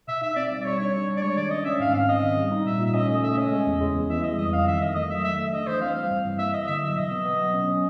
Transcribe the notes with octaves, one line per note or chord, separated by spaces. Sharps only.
B2 E5
D#4 E5
C4 D5
G3
D5
G3 C#5
D4 C#5
G3
D4
D5
G#3 C#5
D#3 D5
C#4 D#5
C#4 E5
G#2 F5
C4 F5
C4 D#5
D#3
G3
D#4
A#2 E5
A#2
E5
C#4 D#5
A3 D#5
A3 E5
C#4 D#5
G#3
E2
G#3
E2
E3 E5
G3 D#5
F2 D#5
F2 F5
D#3 E5
D#3 D#5
A3 D#5
F#3 E5
A3 E5
A3 E5
D4 D#5
E3 C5
C4 F5
G3
G2
E3
A#3 E5
A#3 D#5
D3 E5
F#3 E5
B2 D#5
B3
B3
F#3
C#4
C#4